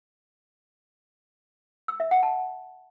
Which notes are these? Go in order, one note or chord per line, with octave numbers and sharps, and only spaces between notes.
E6
E5
F#5
A5